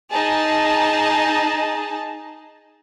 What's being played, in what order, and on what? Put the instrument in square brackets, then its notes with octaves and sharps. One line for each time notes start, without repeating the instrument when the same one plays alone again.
[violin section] D#4 G#4 A5